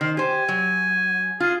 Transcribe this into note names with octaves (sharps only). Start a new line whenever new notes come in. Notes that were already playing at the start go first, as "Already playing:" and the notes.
D#3 C5
G4 C5 G#5
F#3
F4 G#4